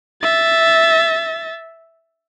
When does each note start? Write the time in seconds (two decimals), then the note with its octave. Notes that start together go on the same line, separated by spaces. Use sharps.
0.22 E5 A6